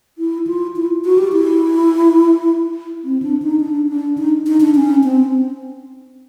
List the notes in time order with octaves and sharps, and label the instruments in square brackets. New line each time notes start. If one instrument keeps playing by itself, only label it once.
[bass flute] E4
F4
E4
F#4
G4
E4
C4
D4
D#4
D4
D4
D#4
D#4
D4
C#4
C4